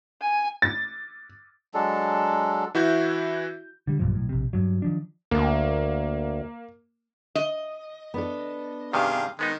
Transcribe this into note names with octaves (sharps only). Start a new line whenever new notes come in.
G#5
A6
F#3 G#3 D4 A4
E3 E4 F#4 E5 G6
D3 G3
B1 G2 A#2 F3
B1 A2
A#1 C3
G2 F#3
D#3 F3 D4
D2 A#3
D#5
B3 D4 A4
G2 C3 D#3 G4 G#4 F5
D#3 G#3 B3 D#4